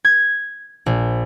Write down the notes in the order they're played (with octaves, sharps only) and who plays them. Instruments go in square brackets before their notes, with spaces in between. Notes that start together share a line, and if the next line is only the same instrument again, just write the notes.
[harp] G#6
A#1